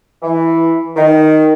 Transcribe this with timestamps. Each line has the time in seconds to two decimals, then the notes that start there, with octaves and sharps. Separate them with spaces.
0.23 E3
0.96 D#3